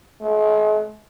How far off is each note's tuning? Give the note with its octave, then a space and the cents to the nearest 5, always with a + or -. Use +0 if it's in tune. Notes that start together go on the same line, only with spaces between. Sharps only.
G#3 +45